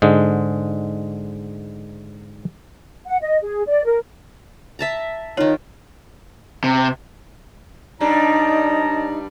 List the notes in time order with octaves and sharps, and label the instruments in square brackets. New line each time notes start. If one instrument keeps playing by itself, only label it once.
[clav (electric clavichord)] G#2 D3 G#3
[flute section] F#5
D#5
G#4
D5
A#4
[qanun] E5 A5 A#5
[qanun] D#3 F4 [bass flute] D#4 [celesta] C#5
[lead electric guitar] C3
[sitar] G2 G3 D4 [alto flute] D#4 [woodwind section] C#5 A5 A#5